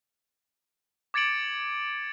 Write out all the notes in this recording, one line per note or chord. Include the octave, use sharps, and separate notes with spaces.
D6 G#6 A6 C#7 D7 F#7